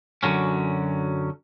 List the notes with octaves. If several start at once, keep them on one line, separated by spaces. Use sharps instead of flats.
F#2 A2 D3 F#3 C#4